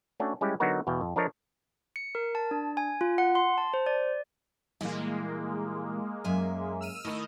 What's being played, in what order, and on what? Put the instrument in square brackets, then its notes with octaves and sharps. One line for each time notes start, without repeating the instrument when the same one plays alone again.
[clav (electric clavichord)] A3 C#4 D4 F#4
G3 G#3 C#4 E4 G4
D3 F#3 B3 D#4 F#4 A#4
E2 B2 F5 G5
F2
F3 D4 A4 A#4 C#5 D#5
[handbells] C#7
A#4
A5
D4
G#5
F4
F#5
C6
A5
C5
D5
[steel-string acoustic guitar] A#2 E3 G3 [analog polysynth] G#3 A#3
[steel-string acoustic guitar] F#2 E5 G#5
[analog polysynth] E6 F6 D#7
[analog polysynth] D#3 D#5 [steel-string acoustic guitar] A3 E4